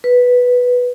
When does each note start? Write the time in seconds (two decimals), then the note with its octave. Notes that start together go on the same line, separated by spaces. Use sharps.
0.04 B4